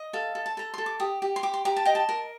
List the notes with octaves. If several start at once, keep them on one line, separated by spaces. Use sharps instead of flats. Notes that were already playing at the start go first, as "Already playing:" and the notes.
Already playing: D#5
A4 F5
A4
A5
A4 A#5
A4 C6
D6
G4 D#6
G4
C6
G4 D6
C6
G4 A#5
A5
D#5 G5
A5
A#4